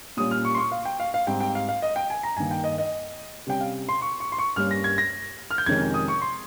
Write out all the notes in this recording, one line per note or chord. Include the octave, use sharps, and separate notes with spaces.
A#2 G3 A#3 C#4 D#6
F6
C#6
C6
C#6
F5
G5
F5
F5
G#2 G3 C4 G5
G5
F5
F5
D#5
G5
G#5
A#5
G2 D#3 A#3 G#5
G5
D#5
D#5
C3 G3 C#4 G5
F5
C6
C#6
C#6
C6
C#6
G2 G3 A#3 C#4 F6
A#6
G#6
A#6
F6
G6
F2 C3 D#3 G#3 C#4 G#6
D#6
C#6
C6